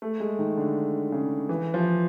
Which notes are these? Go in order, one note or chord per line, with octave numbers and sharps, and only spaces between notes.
A3
G#3
D#3
D3
C#3
E3
F3